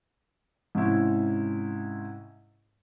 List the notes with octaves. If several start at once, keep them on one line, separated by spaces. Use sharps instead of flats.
G#2 C3 C#4 E4